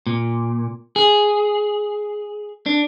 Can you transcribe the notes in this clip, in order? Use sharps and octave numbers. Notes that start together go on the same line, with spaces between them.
A#2
G#4
D4